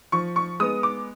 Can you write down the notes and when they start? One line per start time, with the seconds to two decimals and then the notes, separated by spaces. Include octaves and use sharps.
0.12 F3 C#6
0.36 C#6
0.60 G#3 B3 D#6
0.83 D6